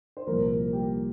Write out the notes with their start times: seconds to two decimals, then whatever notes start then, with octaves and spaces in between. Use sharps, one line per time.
0.17 C5
0.27 C2 A#2 F3 A#3 A#4
0.73 G3 G4